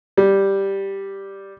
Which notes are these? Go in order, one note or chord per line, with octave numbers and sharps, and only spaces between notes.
G3